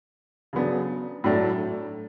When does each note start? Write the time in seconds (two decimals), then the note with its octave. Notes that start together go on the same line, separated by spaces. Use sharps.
0.53 C#3 F#3 B3 D4
1.24 A2 F#3 A3 D4